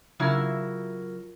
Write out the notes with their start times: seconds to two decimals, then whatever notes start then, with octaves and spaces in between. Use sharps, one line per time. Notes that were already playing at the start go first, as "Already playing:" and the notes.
0.20 C#3 F#3 E4 F4 A#4